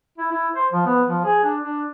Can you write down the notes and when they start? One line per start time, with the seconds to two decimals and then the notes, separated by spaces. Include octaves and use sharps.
0.18 E4
0.31 E4
0.55 C5
0.72 F3
0.86 B3
1.08 F3
1.25 G#4
1.43 D4
1.62 D4